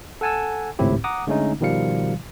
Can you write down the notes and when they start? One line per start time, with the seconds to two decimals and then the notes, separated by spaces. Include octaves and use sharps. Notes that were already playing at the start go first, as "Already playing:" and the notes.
0.21 A4 F#5 G#5 A5 E6
0.79 G#1 C#2 A2 C4 E4 G4
1.04 F#5 A#5 D6 D#6
1.27 D3 G#3 A3 C#4 D#4
1.61 B2 D#3 F3 G3 F5 C#7